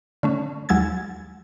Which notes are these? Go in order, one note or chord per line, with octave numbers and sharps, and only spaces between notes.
D3 A3 C#4
D#2 F#3 G#3 E6 G#6 A6